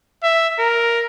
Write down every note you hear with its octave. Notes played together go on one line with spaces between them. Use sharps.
E5
A#4